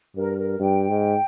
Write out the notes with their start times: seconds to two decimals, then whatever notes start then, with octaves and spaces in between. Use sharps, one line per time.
0.16 G2 A#4
0.38 A#4
0.60 G2 G5
0.89 G#2